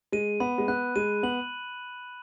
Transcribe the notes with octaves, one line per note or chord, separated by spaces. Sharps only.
G#3 D#7
B3 B5
G#3
B3 F#6
G#3 D#7
B3 F#7